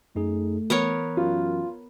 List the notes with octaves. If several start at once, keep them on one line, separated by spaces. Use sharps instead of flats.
F#2 A3 D#4 G#4
E3 B3 A#4 C#5
F#2 F4